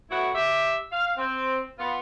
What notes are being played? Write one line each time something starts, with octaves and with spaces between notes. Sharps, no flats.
A2 B3 E4 F#4
G4 E5
F5
C4
B3 F4